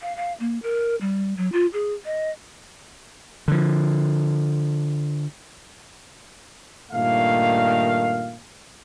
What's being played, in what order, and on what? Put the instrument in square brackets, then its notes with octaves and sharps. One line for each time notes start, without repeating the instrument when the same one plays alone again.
[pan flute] F5
F5
A#3
A#4
G3
F#3
F4
G#4
D#5
[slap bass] D3 F3
[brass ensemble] G2 A#2 D#3 A3 F5